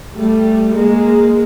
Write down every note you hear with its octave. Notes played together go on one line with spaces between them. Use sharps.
G3 A3
G#3 A#3